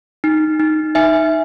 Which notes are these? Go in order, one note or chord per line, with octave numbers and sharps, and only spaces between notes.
D#4
D#4
D#4 E5 G#5